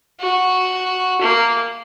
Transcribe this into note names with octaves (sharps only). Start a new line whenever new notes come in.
F#4
A#3